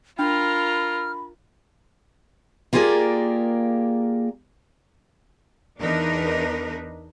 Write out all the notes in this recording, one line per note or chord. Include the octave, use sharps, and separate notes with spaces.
D4 F4 A#4 G5 B5 F6
A#3 F4 G4 G#4 A#4 D5
E2 D4 D#4 A#4 B4